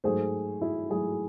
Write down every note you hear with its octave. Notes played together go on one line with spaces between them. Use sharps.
G#2 F#3 A3 G#4 C5
E4 G#4
G#2 F#3 A3 E4 G#4